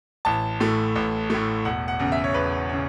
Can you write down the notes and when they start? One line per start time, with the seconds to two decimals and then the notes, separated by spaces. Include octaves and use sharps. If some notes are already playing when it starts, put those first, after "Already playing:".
0.25 A1 A5
0.60 A2 A3
0.95 A1
1.30 A2 A3
1.65 E1 F#5
1.88 F#5
1.99 E2 C#3
2.12 E5
2.24 C#5
2.34 E1 B4
2.69 C#3 C#5